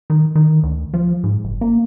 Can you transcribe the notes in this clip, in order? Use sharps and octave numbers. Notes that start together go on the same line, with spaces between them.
D#3
D#3
D2
F3
G#2
F#1
A#3